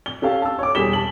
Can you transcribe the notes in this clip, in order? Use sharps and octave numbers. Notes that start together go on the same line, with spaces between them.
G7
C#4 G4 A4 F5
A5 E6
C#5 D6
E1 G3 G#4 B6 E7 G7
A5 F#7